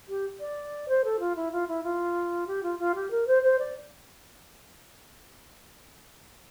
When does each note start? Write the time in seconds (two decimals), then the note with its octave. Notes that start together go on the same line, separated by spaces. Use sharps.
0.09 G4
0.40 D5
0.88 C5
1.04 A4
1.20 F4
1.36 E4
1.52 F4
1.68 E4
1.84 F4
2.47 G4
2.63 F4
2.79 F4
2.95 G4
3.11 A#4
3.27 C5
3.42 C5
3.59 D5